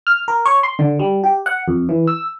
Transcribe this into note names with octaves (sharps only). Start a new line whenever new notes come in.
F6
A#4
C#5
C6
D3
G3
G4
F#5
F2
E3
E6